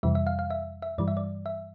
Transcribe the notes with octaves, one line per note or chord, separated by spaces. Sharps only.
F2 C3 E3 G3 E5
E5
F5
F5
E5
E5
G2 E3 G3 D5
E5
D5
E5